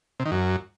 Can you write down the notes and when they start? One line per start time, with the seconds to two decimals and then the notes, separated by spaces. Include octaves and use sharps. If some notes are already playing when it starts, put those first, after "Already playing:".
0.20 C3
0.26 D#3
0.31 F#2